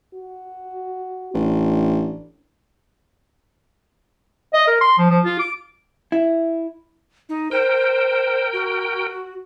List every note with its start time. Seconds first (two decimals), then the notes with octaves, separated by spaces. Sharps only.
0.14 F#4
1.34 A1 D4
4.54 D#5
4.67 A#4
4.81 C6
4.98 F3
5.10 F3
5.24 F4
5.39 D6
6.12 E4
7.29 D#4
7.51 A#4 C5 G5
8.53 F#4